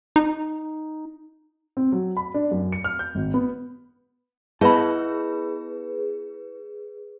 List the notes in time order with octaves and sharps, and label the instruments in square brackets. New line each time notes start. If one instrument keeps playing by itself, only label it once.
[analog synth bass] D#4
[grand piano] C4
F#3
B5
D4
F#2
C#7
F6
G6
G#1
B3
[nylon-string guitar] B3 E4 D#5 [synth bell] G#4 B4 [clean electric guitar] A5 B5